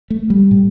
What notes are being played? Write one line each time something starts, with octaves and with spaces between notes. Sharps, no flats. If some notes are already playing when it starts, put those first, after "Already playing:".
A3
G3
A2